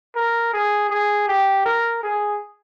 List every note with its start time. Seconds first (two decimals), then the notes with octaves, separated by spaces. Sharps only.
0.16 A#4
0.53 G#4
0.90 G#4
1.28 G4
1.66 A#4
2.03 G#4